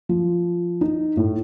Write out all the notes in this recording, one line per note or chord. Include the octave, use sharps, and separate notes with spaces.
F3
D#4
A2